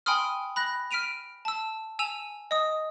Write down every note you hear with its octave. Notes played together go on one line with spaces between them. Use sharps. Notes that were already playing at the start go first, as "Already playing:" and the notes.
G5 G#5 B5 C6 D#6 F6
B5 F#6 A#6
F6 B6 D7 D#7 F7
A5 E6
G#5 E6 E7 F7
D#5 D#6